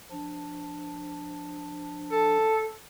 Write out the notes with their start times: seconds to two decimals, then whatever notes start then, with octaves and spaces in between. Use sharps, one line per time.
0.11 F3 D4
2.11 A4